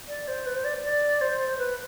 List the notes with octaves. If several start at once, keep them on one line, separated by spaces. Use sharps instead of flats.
D5
C5
B4
C5
D5
D5
C5
B4